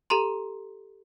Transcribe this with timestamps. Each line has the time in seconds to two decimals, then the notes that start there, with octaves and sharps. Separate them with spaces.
0.10 G4 A4 A#5 C6